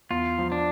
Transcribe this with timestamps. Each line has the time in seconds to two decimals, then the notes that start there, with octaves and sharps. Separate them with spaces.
0.10 E2 F4
0.38 F3
0.52 D4